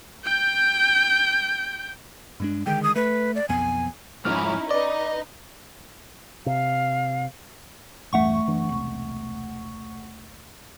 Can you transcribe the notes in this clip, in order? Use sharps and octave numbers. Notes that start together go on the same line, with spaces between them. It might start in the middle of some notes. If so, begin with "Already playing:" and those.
G5 G6
G2 G#3 D4
D3 D#3 G#3 G5
D#6
A3 B4
D5
B1 F2 B3 G#5
F2 G#2 F3 C#4 D#4 E4 F6
D#4 B4 D5 D#5
C3 F5
A1 E2 G2 A3 F#5 C#6
F#1 E3 D4
E1 C2